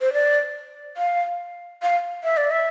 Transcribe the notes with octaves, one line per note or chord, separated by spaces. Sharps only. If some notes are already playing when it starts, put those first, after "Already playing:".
C5
D5
F5
F5
E5
D5
E5